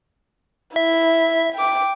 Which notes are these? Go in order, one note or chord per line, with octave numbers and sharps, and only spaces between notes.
E4 E5
G5 D6